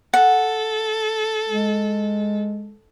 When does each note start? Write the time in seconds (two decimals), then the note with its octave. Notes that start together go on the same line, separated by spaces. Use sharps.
0.14 A4 F#5
1.49 G#3